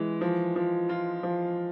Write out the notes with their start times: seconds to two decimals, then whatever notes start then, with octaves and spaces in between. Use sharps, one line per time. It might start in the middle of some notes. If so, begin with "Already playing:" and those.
Already playing: E3 G#3
0.21 F3
0.56 F3
0.89 F4
1.23 F3